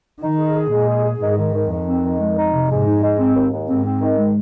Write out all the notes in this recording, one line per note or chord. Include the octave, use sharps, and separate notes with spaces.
D#3 D#4
G#4
G#4
A#2 G#3
G#4
G#4
G#2 D#3
D#3
D#3
F2 D#3
C4
D#3
G#3
D#4
C3
G#2 G#3
D#4
G#3
C4
D#2
D#2
G#2 C4
C4
D#3
G#3